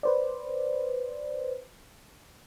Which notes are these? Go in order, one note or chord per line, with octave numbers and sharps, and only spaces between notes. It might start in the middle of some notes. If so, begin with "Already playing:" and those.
B4 C5 D5